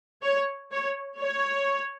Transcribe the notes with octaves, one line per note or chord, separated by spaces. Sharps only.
C#5
C#5
C#5